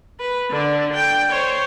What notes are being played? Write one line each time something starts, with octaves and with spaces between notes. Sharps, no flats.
B4
D3 D4
G5
C5 C#5